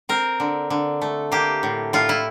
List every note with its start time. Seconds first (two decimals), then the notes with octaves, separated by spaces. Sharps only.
0.09 C4 A#4
0.40 D3
0.70 D3
1.02 A3
1.32 A#3 G4
1.63 A2
1.93 A2 F4
2.09 E4